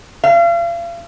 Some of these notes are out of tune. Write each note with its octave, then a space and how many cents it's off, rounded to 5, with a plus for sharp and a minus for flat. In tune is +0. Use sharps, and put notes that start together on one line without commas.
F5 -40